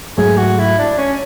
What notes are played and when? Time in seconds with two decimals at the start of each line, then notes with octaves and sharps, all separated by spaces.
0.18 G#2 F#3 A3 G#4
0.37 F#4
0.58 E4
0.78 D4
0.98 C#4